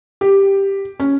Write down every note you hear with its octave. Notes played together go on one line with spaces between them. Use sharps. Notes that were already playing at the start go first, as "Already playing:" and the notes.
G4
C#4